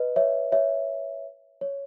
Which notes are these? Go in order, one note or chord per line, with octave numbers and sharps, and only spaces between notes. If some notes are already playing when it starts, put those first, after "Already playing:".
Already playing: B4 D#5
C#5 E5
C#5 E5
C#5